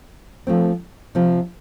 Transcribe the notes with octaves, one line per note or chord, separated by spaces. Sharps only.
F3 A3 C4
C3 F3 C4